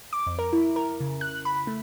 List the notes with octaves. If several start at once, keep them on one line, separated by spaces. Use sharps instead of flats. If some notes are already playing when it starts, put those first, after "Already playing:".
D6
F2
A#4
E4
A#4
C#3
F#6
B5
A3